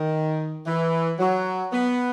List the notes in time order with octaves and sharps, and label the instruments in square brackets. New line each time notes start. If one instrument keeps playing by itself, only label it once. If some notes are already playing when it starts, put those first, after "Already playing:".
Already playing: [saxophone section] D#3
E3
F#3
B3